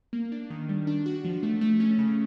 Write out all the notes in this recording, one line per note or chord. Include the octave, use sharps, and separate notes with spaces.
A#3
D4
D#3
G3
D4
F#4
F3
A3
A3
C#4
C#3